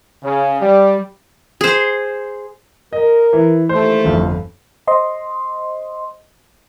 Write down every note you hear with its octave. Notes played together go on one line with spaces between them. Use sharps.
C#3
G3
G#4 C5
A#4 D#5
E3
D#2 E3 A3 C5
G1 F2
C5 D#5 C6